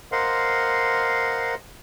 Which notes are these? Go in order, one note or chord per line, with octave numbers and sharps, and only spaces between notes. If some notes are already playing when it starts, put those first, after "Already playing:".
A#4 C5 D#5 F5 F#5 C6